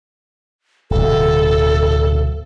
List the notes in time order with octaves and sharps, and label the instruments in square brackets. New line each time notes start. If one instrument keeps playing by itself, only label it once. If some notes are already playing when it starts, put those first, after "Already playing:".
[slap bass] D1 B2 [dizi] A4